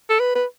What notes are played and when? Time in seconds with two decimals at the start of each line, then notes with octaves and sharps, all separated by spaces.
0.10 A4
0.20 B4
0.35 B4